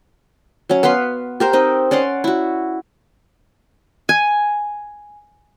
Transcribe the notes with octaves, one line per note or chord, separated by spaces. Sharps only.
F#3 C#4
B3 B4 F5 C6
G4 A#4 C5
C4 D#4 D#5
C#4 D5 F#5 C6
E4 F#4
G#5